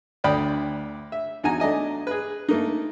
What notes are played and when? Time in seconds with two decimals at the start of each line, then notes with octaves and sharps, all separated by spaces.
0.24 D2 D4 D5 G5 B5 D#6
1.12 E5
1.43 E2 D#4 F#4 G#5 A#5
1.60 A3 D4 D#5 G#5
2.07 G#4 B4
2.49 A3 A#3 D#4